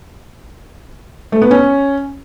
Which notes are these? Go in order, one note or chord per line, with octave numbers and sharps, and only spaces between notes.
A3
B3
C#4